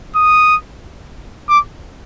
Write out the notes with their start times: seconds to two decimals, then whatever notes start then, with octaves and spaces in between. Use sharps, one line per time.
0.16 D#6
1.49 D6